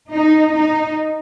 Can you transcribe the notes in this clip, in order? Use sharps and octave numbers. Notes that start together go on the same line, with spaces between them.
D#4
D#4